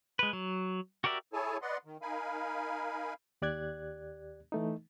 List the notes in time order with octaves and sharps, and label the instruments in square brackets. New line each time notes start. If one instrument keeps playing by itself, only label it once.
[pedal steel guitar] G#3 B4
F#3
F#4 G4 A#4 D5 E5
[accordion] E4 G#4 A4 C#5 G#5 A5
B4 D5 D#5 F#5 C6
D#3
D#4 A#4 F5 G#5 B5
[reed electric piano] D#2 G4 D5 F#6 G#6
E3 A3 D#4